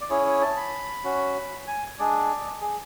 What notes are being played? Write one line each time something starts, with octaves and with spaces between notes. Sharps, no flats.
D5
C#4 E4 G#4 C#5
C#5
A5
B5
C#4 F#4
G#5
G#3 D4 G#4 D5
G#4